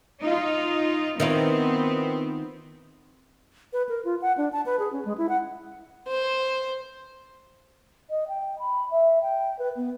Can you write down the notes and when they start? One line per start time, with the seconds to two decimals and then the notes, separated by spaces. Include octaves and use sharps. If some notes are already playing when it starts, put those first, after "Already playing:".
0.22 D#4 F4
1.20 D#3 B3 C4 E4 F4
3.73 B4
3.89 A#4
4.05 F4
4.22 F#5
4.37 D4
4.53 A5
4.66 B4
4.79 G#4
4.92 C#4
5.05 G#3
5.18 E4
5.29 F#5
6.08 C5
8.10 D#5
8.28 G5
8.59 B5
8.90 E5
9.21 G5
9.59 B4
9.75 B3